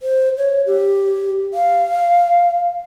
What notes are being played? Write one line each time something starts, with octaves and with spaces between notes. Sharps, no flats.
C5
C#5
G4
F5